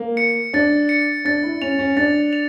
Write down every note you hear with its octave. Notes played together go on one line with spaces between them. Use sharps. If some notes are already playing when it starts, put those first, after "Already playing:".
Already playing: A#3
C#7
D4 A6
C#7
D4 A6
E4
C#4 F7
C#4
D4 A6
F7